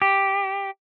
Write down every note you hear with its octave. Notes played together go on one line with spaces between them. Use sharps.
G4